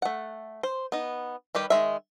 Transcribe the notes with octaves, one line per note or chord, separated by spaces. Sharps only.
A3 F#5
C5
B3 D#4
D#3 G3 G4 B4
D#3 G#3 E5